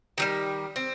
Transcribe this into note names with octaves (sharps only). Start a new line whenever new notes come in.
D#3 F#3 G3
C4